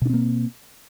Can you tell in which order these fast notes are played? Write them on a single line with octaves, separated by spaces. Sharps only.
B2 D4 C4 A#3